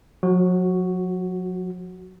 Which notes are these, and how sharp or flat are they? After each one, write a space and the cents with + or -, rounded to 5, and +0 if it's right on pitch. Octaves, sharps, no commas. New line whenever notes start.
F#3 -40 F#4 +0